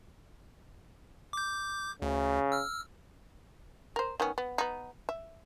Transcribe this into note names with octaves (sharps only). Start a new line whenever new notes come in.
D6 G6
D2 C#3
E6 F6
A#4 C5
D#3 B3 C#4
B3
B3 D#4
E5